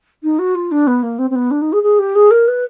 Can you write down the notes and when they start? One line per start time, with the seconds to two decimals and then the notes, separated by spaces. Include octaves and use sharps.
0.23 D#4
0.39 F#4
0.55 F4
0.71 D4
0.87 B3
1.03 A#3
1.18 C4
1.30 C4
1.35 B3
1.51 D4
1.61 D#4
1.72 G#4
1.83 G#4
1.99 G4
2.15 G#4
2.31 A#4
2.48 B4